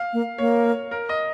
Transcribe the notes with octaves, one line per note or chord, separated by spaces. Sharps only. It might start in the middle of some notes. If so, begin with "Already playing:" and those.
Already playing: F5
A#3
A#3 C#5
A#4
D#5